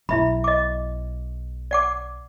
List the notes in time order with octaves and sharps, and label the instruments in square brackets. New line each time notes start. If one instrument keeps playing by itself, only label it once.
[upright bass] B1 [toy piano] E4 E5 B5
[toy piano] D#5 D6
D5 F#5 D6